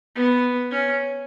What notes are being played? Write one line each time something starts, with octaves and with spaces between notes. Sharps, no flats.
B3
C#4